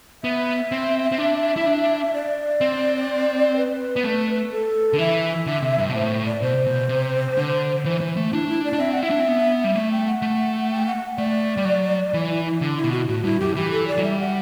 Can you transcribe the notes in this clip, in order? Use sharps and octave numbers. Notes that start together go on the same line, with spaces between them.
B3 E5
C4
C4
D4
E4
D4
D5
C4
B4
B3
A3
A4
D3
E3 E5
D3
C3
G2
B2
A2 C5
D5
B2 C5
C3
B2
C3
D3
E3
E3
A3
D4 E4
E4
D5
D4
C4 E5
F#5
E4 E5
D4
C4
B3
G3
A3 E5
G5
F#5
A3
G5
F#5
A3 D5
G3
F#3
E3
E4
E4
D3 D4
E4
B2
F#4
A2 F#4
G2 E4
F#2 G4
E3 G4
A4
D5
F#3
G3 E5
F#5